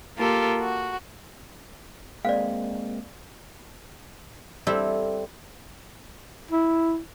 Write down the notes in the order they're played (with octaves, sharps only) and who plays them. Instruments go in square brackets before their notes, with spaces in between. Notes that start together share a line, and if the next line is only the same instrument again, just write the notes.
[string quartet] A#3 F4 G4 A4 A#4
F#4
[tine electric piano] G#3 A#3 C4 [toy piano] D5 F5
[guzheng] G3 C4 E4 G4 A4
[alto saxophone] E4